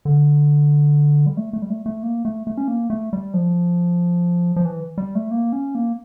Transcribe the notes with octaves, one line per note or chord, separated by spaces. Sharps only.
D3
G3
A3
A3
G3
A3
A3
A#3
A3
A3
C#4
A#3
A3
G3
F3
F3
E3
G3
A3
A#3
C#4
A#3